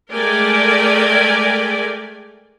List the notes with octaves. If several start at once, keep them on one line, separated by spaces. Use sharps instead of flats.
G#3 A3 A#4 D5 G5 G#5